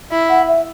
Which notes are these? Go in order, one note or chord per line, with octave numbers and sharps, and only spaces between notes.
E4
F#5
E5